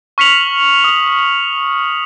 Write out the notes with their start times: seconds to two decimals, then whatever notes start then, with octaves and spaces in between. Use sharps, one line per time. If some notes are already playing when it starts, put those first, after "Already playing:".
0.18 C#6 F6 B6 C#7 F7 F#7
0.84 D#6